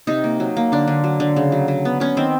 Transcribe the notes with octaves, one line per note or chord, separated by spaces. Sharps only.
C3 D#4
A#3
F#3
A#3
D3 D4
D3
F#3
D3
C#3
F#3
F#3
B3
B3 C#4
D#3 C4